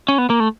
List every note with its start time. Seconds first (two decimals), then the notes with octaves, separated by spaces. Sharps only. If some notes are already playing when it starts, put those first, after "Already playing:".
0.09 C#4
0.18 B3
0.30 A#3
0.40 A3